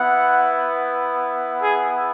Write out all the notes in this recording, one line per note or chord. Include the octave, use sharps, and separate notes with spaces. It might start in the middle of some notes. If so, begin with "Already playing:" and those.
Already playing: B3 E4 F#5
G#4